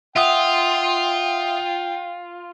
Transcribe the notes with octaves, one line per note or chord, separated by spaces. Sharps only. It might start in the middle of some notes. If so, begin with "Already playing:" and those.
F4 E5 F#5 G5 D#6